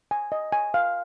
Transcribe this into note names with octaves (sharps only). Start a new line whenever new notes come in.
G#5
D#5
G#5
F5